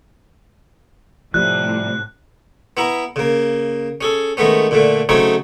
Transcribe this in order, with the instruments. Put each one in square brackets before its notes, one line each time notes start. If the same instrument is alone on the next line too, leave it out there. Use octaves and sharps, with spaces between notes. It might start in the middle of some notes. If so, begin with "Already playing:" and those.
[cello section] A2 C3 [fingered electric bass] F3 G3 [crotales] F#6
[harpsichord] B3 E4 A#5
C#3 A#3
C#4 G#4 A4
D#3 G#3 A3 B3 C#4
A#2 D3 A3
C#3 F#3 A3 C4 D#4 C#5